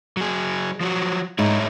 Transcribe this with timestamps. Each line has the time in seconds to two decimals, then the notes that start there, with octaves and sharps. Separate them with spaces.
0.17 F#3 G#4
0.81 F3 F#3 F#4
1.39 G#2 D#4 E4 C#5